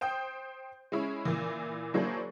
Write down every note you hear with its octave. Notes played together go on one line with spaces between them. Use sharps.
C5 G5 D#6 G6
G#3 C#4 E4
A#2 E3
F#3 A#3 D4 E4 G#4 C5